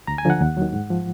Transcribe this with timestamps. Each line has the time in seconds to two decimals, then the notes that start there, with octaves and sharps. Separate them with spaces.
0.07 D2 A#5
0.18 G#5
0.25 D3 F3 F#5
0.41 D#2
0.57 D#3 F#3
0.73 G#2
0.90 F3